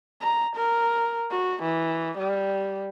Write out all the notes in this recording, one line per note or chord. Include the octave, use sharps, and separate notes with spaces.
A#5
A#4
F#4
E3
G3